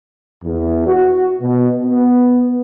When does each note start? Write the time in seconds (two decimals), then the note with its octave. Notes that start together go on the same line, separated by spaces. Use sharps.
0.44 E2
0.87 F#4
1.41 B2
1.85 B3